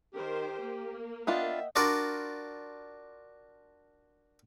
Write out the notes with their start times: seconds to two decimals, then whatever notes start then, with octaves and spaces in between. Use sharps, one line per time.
0.14 D#3 G4 A#4 C5
0.61 A#3
1.27 B3 D4 F4 D#5 E5 F#5 G5
1.76 D4 F4 F#4 A#4 D5